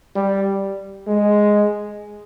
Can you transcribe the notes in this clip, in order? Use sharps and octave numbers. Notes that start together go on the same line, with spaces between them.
G3
G#3